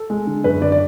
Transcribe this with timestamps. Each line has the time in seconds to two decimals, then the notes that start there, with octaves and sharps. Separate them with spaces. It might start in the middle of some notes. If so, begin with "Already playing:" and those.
Already playing: A4
0.10 G#3
0.27 D3
0.44 F#2 B4
0.61 D3 D5
0.72 D5